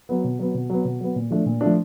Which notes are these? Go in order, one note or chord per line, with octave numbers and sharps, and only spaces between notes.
F#3 B3
B2
F#3 B3
B2
F#3 B3
B2
F#3 B3
A#2
F3 A3 D4
A#2
F3 A3 D4